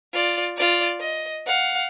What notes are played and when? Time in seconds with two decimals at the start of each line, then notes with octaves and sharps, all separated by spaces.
0.13 F4 D5
0.56 F4 D5
1.00 D#5
1.46 F5 F#5